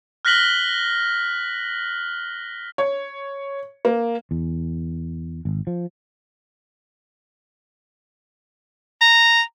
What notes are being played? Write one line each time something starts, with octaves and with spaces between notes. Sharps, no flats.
F6 F#6 A#6 B6 F#7 G7
C#5
A#3
E2
G#1
F3
A#5